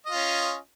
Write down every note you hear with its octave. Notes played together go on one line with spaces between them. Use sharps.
C#4 F4 D#5